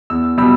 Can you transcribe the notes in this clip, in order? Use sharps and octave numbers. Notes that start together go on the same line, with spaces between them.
E2 E6
B2 G3 E6